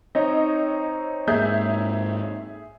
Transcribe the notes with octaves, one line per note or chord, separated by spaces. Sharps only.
C4 D#4 C#5 D#5
G#2 A#3 G#4 E5 G6